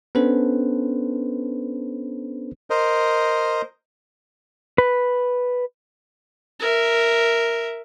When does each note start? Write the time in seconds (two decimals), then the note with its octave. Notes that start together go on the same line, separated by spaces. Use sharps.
0.15 B3 C#4 D4 A4 B4 C5
2.70 A#4 C5 D#5
4.78 B4
6.60 A#4 E5